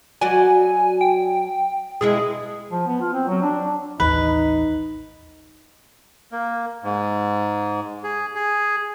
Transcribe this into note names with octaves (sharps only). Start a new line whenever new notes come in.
F#3 F#4 D5 G#5
G5
B2 G#3 E4 G#4
F3
B3
F4
C4
F#3
D4
A1 D#2 E3 D#4 B4
A#3
G#2
G#4
G#4